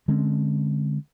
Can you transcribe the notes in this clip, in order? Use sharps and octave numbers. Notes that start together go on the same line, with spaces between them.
D3 G#3 C4 C#4